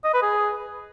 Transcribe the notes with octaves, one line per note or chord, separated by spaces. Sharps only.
D#5
B4
G#4